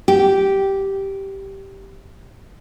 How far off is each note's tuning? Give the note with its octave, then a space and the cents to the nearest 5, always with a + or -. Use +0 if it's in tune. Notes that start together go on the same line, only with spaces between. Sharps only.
G4 -10